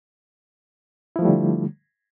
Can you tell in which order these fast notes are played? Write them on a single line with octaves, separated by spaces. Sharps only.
E4 F3 A3 G3 D3